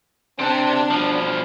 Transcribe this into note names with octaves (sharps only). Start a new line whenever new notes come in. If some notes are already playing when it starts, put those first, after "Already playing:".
C3 C4 D4
B2 F3